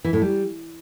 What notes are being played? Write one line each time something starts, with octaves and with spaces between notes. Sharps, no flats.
E3
A2
G3